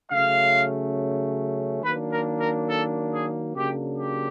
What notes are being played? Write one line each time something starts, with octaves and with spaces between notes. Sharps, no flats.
C#3 F#3 A3 C#4 F5
D#3 F#3 A#3 D4 B4
A#4
A#4
A4
G#4
C#3 F#3 A#3 D4 G4
G4